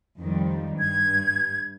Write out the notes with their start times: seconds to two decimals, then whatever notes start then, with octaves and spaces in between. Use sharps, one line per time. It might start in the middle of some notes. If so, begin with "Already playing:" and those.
0.19 F2 D#3 G3
0.78 G2 G#6